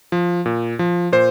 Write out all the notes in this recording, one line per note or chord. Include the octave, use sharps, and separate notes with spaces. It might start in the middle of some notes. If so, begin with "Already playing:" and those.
F3
A#2
F3
A#2 C5